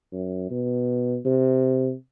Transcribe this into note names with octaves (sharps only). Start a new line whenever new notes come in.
F#2
B2
C3